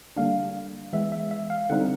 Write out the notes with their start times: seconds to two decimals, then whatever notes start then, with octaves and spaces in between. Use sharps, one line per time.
0.16 D3 G3 A#3 D4 F5
0.93 E3 G#3 B3 E5
1.12 E5
1.31 E5
1.50 F5
1.70 D3 G3 C4 D#4 F#5